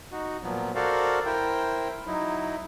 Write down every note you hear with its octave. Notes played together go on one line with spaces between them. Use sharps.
D#4 F#4
A#2 F3 F#3 B3
F#4 A4 A#4 C5 D5 F5
E4 A#4 C5 G5
F#3 D#4 E4